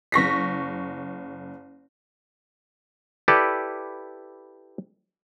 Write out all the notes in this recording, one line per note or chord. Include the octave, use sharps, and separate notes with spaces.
F#1 C#6 A#6 B6
E4 G4 A4 B4 D5